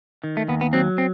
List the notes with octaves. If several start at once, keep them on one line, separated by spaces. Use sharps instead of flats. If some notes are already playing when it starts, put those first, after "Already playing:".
D#3
A3
D#2 B3
B3
F#3 C4
C4